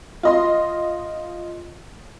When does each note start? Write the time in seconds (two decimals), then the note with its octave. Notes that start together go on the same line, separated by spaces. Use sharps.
0.23 F4 D#5 C6